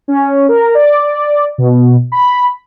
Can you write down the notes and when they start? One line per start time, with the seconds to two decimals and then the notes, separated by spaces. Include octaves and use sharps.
0.08 C#4
0.49 A#4
0.75 D5
1.58 B2
2.12 B5